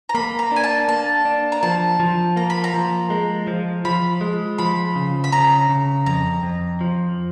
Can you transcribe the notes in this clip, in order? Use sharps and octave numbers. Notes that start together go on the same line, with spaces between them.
A#5
A#3 B5
A#5
D4 G#5
A5
A#3 A5
D4
A#5
F3 A5
F3
A#3 A#5
B5
A#5
F3
G#3
F3
F3 B5
G#3
F3 B5
C#3
B5
C#3 A#5
C#3
F2 A#5
F2
F3